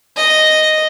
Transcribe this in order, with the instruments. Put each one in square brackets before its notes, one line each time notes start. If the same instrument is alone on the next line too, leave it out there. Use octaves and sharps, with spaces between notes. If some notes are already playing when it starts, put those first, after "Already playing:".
[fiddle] D#5